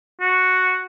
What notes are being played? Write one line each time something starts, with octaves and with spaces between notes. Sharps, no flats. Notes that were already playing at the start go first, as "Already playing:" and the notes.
F#4